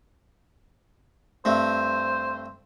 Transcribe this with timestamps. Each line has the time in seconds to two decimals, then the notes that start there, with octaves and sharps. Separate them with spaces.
1.45 G2 A3 C4 C5